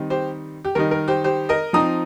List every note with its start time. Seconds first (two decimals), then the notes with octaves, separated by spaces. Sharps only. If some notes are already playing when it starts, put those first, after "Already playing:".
Already playing: D#3 G3 C4 D#4
0.10 G4 C5
0.65 G4
0.75 D#3 G3 D#4 A#4
0.91 A#4
1.08 G4 C5
1.24 G4 C5
1.49 A#4 D#5
1.73 F3 C4 D#4 A#5 D#6